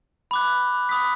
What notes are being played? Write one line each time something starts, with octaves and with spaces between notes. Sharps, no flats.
B5 D6 F#6
B5 D#6 F#6 B6